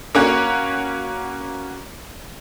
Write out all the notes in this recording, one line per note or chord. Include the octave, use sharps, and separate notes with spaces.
A#3 C#4 F#4